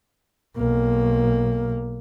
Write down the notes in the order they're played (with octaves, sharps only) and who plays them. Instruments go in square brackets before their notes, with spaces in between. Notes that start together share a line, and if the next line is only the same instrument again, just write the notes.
[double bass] B1 A#3